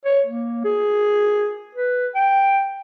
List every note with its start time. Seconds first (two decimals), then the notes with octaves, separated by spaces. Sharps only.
0.05 C#5
0.26 A#3
0.65 G#4
1.75 B4
2.15 G5